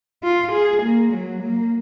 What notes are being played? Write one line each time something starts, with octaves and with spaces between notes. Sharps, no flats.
F4
G#4
A#3
F#3
A#3